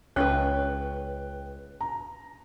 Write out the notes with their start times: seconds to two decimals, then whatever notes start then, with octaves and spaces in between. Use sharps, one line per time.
0.16 C#2 C#4 B4 G5 F#6
1.81 A#5